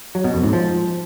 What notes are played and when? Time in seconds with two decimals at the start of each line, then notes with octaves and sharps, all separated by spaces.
0.15 F#3
0.24 B2
0.34 F2
0.43 G#2
0.53 F3